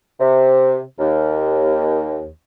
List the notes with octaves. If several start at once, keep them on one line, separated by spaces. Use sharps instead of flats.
C3
D#2